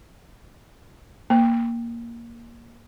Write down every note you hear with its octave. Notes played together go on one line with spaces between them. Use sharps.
A#3